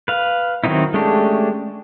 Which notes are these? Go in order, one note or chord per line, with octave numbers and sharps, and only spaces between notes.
B4 F5
D#3 F#3 C4 D#4 E4
G#3 A3 C#4 D4 G4